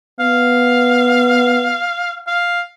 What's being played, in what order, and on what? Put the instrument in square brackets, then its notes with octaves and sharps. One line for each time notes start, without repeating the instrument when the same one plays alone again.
[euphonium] B3 [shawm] F5
[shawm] F5